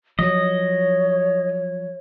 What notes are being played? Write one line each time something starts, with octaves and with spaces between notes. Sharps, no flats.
F3 F#3 C#5 D#5